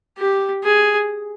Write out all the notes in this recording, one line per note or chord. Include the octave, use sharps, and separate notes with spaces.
G4
G#4